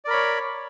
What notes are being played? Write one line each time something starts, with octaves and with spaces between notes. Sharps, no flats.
A#4 C#5 D5 B5